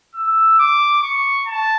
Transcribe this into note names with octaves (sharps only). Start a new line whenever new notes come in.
E6
D6
C#6
A5